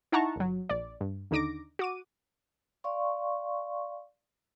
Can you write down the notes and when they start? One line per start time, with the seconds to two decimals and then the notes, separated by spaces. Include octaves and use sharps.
0.12 D#4 E4 F#5 A5 A#5 C#6
0.36 G1 F#3
0.69 A#1 D5
1.01 G2
1.31 D#2 D3 D#4 D6 A#6 D7
1.79 F#4 D6 D#7
2.84 D5 F5 C6 C#6